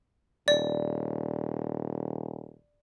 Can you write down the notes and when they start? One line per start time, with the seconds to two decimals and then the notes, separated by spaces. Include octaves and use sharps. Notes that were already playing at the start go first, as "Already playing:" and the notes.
0.48 D#1 D5